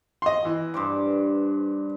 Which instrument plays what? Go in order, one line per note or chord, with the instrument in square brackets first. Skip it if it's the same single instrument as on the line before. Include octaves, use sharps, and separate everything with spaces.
[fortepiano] D#5 C6
E3
[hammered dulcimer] G2 C5 D6